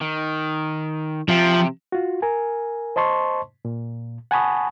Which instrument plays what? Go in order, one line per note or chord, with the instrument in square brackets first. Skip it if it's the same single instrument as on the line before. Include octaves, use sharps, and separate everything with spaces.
[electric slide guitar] D#3
[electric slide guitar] C3 E5 G5 [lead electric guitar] F3
[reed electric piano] F4 F#4
A#4 G#5
C5 D#5 A5 C6 C#6
A#2
F#5 G#5 A5 B5 C#6 D#6